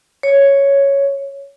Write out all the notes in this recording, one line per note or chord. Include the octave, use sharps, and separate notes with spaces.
C#5